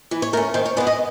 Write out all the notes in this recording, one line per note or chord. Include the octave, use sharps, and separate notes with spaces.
E3 B4
C#5
A3 C#4 A#4
D#3 C5
C#5
G#3 B3 E4 D5
D#5